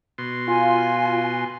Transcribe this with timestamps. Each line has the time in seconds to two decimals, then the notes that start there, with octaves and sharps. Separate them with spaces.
0.18 B2 C6
0.48 F4 G#5